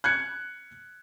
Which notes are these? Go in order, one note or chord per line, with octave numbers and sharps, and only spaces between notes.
F#6 G#6 C#7